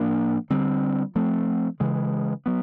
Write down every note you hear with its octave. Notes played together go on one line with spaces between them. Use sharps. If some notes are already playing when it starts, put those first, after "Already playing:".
Already playing: A2 F3 A#3 D4
D3 G3 C4
F3 A3 C4
C#3 E3 G#3
F#3 B3